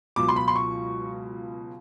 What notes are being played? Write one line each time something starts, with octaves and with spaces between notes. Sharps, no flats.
C#2 B2 F#3 D6
C6
B5
C6
C#6